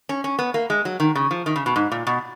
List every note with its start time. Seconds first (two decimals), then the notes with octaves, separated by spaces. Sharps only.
0.09 C#4
0.24 C#4
0.39 B3
0.54 A#3
0.70 G#3
0.85 F#3
1.00 D#3
1.15 C#3
1.31 F3
1.46 D#3
1.56 C#3
1.66 B2
1.76 G#2
1.92 A#2
2.07 B2